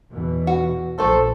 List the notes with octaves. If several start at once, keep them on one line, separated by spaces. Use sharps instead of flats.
E2 B2 E3
F#4
A#1 F3 A3 A4 C5